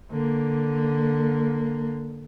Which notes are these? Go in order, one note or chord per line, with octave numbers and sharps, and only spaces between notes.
D3 A#3